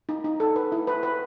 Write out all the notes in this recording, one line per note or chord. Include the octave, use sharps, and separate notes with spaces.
D#4
D#4
A4
B4
E4
B4
B4